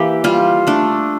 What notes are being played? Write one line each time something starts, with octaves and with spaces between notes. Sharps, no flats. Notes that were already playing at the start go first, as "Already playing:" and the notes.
Already playing: E3 A#3 G4
G3 F4
A3 D4